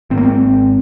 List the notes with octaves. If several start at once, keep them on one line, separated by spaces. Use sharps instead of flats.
G#1 G#2 C4
A#3
C4